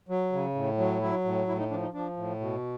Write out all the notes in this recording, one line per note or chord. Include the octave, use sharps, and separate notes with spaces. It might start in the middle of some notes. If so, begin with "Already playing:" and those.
F#3
C#3
A2
F#3
F#3 E4
A2
A2 E4
D#4
F3 D4
D#4
F3 D4
A2
B2